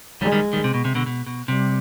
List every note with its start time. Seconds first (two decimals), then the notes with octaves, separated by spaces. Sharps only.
0.21 D#3 G3 G#3
0.32 D#3 G3
0.53 D#3 G3
0.64 C3
0.74 B2
0.85 C3
0.95 B2 D3
1.06 B2
1.27 B2
1.48 C3 G3